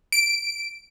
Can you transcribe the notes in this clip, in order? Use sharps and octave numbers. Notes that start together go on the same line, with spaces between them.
D7